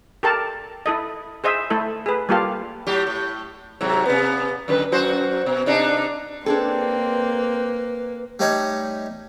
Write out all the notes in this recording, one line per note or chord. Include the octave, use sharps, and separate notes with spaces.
G4 A4 A#4 A5
E4 A4 D#5
G#4 C5 D#5 E5
A3 E4 A4
G#4 B4
G3 A#3 F4 G4 A4 F5
A2 F#3 G4
A2
G#2 C3 F#3
C3 B3
F#2 D3 B4
F#2 F#4 C5
B2
C3 D4 D#4
A#3 C4 D4 G#4 A4 B4
G3 A3 D#4 C#5